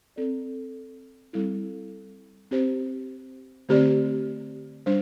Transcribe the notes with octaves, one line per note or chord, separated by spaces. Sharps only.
C4 A4 D5
G3 C4 E4 A4
C4 G4 C5
D3 A3 C4 G4 D5
G3 D4 C5